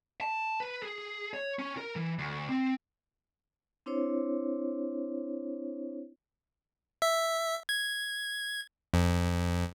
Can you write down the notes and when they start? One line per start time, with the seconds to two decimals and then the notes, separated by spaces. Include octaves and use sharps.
0.21 A5
0.60 B4
0.83 G#4
1.34 C#5
1.59 C#4
1.77 A#4
1.96 E3
2.19 D2
2.49 C4
3.86 C4 D4 E4 C5 C#5
7.02 E5
7.69 G#6
8.94 F2